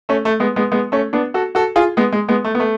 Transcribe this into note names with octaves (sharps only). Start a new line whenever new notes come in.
A3 C#4
A3
G#3 B3
G#3 B3
G#3 B3
A3 C#4
B3 D4
F#4 A4
F#4 A4
F4 G#4
G#3 B3
G#3
G#3 B3
A3
B3
A3